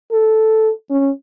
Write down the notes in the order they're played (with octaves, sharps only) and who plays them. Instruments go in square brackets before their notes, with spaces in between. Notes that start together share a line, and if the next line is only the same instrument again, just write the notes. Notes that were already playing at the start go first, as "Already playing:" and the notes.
[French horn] A4
C#4